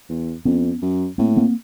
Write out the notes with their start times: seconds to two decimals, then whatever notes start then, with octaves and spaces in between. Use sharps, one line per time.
0.09 E2
0.45 F2 B3 C#4
0.82 F#2
1.18 A2 A#3 C4
1.37 A#3 C4